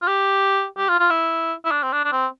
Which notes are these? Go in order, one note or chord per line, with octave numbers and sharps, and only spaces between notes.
F4
G4
G4
F4
F4
E4
E4
D4
C4
D4
D4
C4